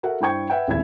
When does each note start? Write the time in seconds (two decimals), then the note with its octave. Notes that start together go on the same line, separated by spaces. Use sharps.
0.03 F#4 A4 A#4 E5 F#5
0.21 G2 E4 C5 G5 C#6 G#6
0.50 B4 E5 F#5 G5
0.68 D#1 G#1 C#2 E4 E5 G#6